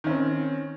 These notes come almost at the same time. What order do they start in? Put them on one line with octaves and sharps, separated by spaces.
D#3 C#4 C4